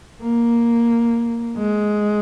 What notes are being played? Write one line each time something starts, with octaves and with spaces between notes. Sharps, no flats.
A#3
G#3